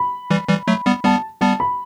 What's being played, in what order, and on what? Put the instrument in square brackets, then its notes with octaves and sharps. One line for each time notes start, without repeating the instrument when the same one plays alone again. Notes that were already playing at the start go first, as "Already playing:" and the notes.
Already playing: [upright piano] B5
[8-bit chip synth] E3 G3
E3 G3
F#3 A3
G3 B3
[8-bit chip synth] G3 B3 [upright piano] A5
[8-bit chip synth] G3 B3 [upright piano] A5
[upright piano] B5